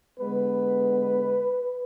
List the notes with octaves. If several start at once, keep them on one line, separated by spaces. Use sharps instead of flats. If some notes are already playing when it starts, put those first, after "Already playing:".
D3 G#3 B3 B4